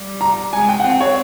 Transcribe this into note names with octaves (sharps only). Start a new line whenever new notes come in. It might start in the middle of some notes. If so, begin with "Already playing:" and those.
Already playing: G3
A#5
G#3 G#5
G5
F#5
C4 G5
C#5